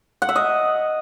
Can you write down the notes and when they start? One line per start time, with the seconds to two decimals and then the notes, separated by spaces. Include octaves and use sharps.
0.22 F#5
0.29 E5
0.36 D#5